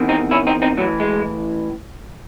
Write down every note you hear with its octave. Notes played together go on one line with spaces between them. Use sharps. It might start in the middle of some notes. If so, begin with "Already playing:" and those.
Already playing: E2 C3 D#3
C4 D#4
C#4 E4
C4 D#4
C4 D#4
A2 E3 F#3
G#3